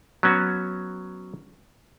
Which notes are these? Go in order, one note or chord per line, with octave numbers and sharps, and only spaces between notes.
F#3 B3 C#4 F#4